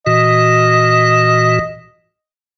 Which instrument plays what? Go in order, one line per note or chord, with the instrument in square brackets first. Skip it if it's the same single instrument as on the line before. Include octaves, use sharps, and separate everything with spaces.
[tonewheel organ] A#2 E3 F#4 [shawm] D#5